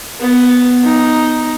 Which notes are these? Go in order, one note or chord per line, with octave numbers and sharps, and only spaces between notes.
B3
D#4